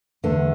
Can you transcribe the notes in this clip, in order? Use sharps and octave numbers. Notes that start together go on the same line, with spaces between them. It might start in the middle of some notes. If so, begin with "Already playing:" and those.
E2 D3 A3